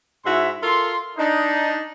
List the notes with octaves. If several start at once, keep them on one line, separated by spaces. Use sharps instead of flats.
G#2 E4 F#4 E5 C6
F4 A4 A#4 C6
D4 D#4